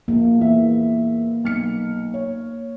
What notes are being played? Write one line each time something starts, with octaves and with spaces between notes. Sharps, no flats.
A#1 A#3
E2 E5
B1 F6 C#7
C#5